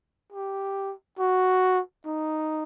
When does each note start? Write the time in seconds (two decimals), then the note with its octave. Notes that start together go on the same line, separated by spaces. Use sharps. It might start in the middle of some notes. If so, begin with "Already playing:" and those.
0.32 G4
1.19 F#4
2.06 D#4